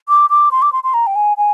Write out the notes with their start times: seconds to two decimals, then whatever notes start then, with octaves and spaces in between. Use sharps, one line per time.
0.09 D6
0.30 D6
0.51 C6
0.62 D6
0.72 C6
0.84 C6
0.94 A#5
1.07 G5
1.16 G#5
1.37 G#5